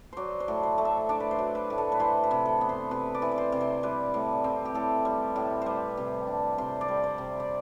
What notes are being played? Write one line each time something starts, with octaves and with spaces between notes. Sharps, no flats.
F#3 C5 D5
C5
A2
C5
A3
E5
D4 D5
B4
C5
F#3
B4
A2
A4
B4
E3 C5
B4
C3
A4
B3
C5
C3 B4
D5
E3
D5
C5
C3
C5
G3 B4
A2
C4
G4
A2 A4
G3
A2
G3 B4 C5
C3
D4
C3 C5
D5
G3
C5
C3
D5